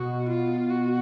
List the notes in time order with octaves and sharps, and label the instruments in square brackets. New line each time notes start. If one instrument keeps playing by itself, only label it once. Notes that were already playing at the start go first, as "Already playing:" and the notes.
Already playing: [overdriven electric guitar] B2 [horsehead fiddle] F#4
[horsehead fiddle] F4
F#4